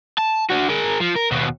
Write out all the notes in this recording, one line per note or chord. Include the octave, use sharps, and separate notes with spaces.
A5
D4 F#4
G#4 A#4
F3
A#4
D#2 B2